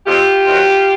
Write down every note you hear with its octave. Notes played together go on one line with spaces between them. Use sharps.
F2 F4 G4
C3 D#3 F#3